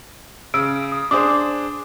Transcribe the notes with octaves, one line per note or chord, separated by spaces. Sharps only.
C#3 E6 D7
D#6
D4 G#4 C5 D6 D#6